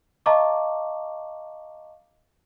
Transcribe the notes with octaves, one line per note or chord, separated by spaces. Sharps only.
D#5 F5 A5 A#5 C#6 D6